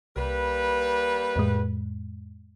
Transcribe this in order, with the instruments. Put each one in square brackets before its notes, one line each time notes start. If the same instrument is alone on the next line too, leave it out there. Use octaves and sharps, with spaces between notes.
[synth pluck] C2 [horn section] G3 A#3 B4
[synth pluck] F2 A2 G#3